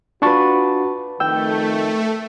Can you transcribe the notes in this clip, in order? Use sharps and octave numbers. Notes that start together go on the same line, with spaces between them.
D4 F4 F#4 B4 A5 C#6
F2 D#3 A3 G5 E6